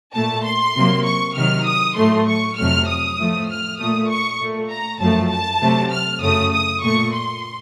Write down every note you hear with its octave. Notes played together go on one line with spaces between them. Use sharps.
A#2 A3 A5
C6
C3 F#3 A#3
C#6
C3 D#3 F#3 F6
D#6
A2 F#3 A3 C6
C#6
F2 C3 F#3 A3 F6
D#6
A2 F3 A3
F6
A#2 A3 D#6
C#6
A#2 A3
A#5
F#2 F3 A3 A5
A5
C3 F#3 A3
F6
F#2 C#3 A3 D#6
D#6
A#2 A3 C#6
C6